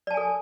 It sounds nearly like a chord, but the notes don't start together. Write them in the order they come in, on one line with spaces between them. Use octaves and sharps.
D5 A5 G#5 A4